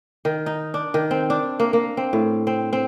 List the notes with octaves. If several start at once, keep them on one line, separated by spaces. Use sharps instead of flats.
D#3
D#4
D4
D#3
C4
D4
A#3
A#3
C4
A2
C4
C4